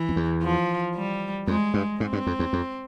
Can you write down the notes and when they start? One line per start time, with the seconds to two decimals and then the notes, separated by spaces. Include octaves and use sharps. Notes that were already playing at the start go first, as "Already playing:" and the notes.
Already playing: E3
0.09 F2
0.16 E2
0.42 F3
0.95 G3
1.47 F2 G#3
1.74 G2
2.00 G#2 C4
2.13 G2
2.27 F2
2.39 E2
2.53 F2